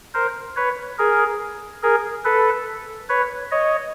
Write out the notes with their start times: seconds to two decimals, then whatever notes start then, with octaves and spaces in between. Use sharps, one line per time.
0.14 A#4 C5
0.56 B4 C#5
0.98 G#4 A#4
1.83 G#4 A#4
2.25 A4 B4
3.09 B4 C#5
3.51 C#5 D#5